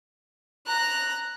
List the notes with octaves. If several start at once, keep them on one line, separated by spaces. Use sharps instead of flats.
A#5 F#6